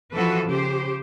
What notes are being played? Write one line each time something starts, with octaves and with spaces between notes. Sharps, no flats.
E3 F3 F#4 A4 B4
C#3 G4 C5